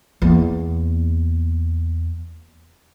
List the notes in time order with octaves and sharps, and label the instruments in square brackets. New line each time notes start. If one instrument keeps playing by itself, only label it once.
[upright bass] E2 A#3